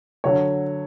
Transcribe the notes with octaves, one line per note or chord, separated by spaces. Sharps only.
D3 F#3 C#5